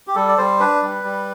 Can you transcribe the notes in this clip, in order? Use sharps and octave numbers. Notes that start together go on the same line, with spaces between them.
G4
G3 A4
D5
G3 C5
D4 B4
G3
G3